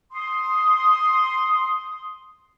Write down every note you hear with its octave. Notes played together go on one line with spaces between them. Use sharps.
C6 D#6